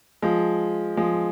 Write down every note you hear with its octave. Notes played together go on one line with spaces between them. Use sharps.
F3 G#3
F3 G#3